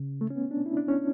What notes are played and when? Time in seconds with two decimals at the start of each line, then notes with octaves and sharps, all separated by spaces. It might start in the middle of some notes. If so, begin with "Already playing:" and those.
Already playing: C#3
0.21 A3
0.30 C#4
0.36 B3
0.51 D4
0.66 E4
0.77 D4
0.88 C#4